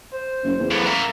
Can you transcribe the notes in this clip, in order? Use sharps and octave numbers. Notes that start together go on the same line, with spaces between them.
C5
F#1
E2
B1 A2 A#3
A#4 E5